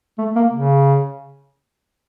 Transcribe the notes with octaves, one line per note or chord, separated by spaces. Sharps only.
A3
A#3
C#3